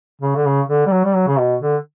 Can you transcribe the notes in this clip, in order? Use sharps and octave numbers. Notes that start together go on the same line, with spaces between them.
C#3
D3
C#3
D3
G3
F#3
G3
F#3
C#3
B2
D3